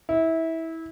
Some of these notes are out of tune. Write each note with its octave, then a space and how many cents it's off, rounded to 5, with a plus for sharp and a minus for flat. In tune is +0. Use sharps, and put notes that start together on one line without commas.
E4 -20